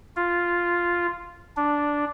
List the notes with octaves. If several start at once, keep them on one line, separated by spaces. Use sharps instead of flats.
F4
D4